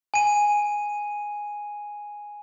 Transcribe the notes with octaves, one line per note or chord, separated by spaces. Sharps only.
G#5 D#7